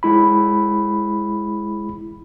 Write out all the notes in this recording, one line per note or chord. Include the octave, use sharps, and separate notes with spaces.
G#3 E4 B5